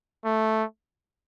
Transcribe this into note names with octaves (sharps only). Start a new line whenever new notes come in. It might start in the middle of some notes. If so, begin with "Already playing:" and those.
A3